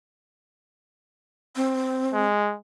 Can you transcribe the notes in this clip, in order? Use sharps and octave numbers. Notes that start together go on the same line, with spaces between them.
C4
G#3